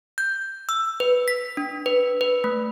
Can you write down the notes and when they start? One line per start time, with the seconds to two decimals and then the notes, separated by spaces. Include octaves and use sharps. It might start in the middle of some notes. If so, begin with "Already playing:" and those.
0.18 G6
0.69 E6
1.00 B4
1.28 B6
1.57 D4
1.86 B4
2.21 B4
2.44 A3